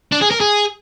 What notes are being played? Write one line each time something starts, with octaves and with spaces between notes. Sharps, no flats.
D4
G#4
A#4
G#4